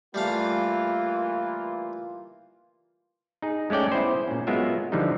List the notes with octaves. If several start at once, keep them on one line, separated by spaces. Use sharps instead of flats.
E3 G3 A3 A#3 F4 F5
D#4 G#4
G#3 A3 C#4 D5 G5
B3 E4 G#4 C5
A#2 C#4
F#3 G#3 B3 F4 A#4 E5
D3 E3 F3 G3 D#4